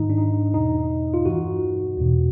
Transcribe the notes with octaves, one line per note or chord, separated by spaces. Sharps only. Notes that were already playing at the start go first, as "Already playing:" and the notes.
Already playing: G#2 D#3 D#4
D4
D#4
E2 B2 D#4
F4
G2 E3 F#4
E2 B2